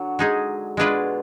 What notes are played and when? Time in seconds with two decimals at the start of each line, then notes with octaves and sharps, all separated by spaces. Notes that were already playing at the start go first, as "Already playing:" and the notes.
Already playing: D3 F#3
0.19 G#3 D#4 G#4
0.77 B2 G#3 D4 F4 G#4 B4